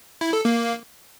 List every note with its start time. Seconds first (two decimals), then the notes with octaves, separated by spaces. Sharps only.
0.21 E4
0.33 A4
0.45 A#3